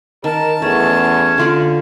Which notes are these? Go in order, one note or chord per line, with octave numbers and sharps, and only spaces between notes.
D#3 A#4 A5
E2 A3 C#4
D3 F4 D5